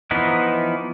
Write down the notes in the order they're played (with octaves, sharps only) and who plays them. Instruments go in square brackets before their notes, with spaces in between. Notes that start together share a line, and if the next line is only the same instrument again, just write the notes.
[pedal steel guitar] E3 F3 B3 D#4 E4